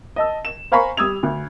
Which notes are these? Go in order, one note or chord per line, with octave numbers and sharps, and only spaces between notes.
D#5 A5 E6
E7
C5 F5 G#5 A#5 B5 C#6
G3 D#6 E6 G#6 F7
D2